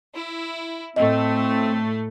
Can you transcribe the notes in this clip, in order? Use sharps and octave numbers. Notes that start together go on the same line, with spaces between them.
E4
A2 A3 C4 D#5